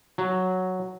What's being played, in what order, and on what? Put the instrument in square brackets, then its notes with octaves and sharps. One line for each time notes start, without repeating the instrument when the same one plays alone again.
[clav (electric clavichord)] F#3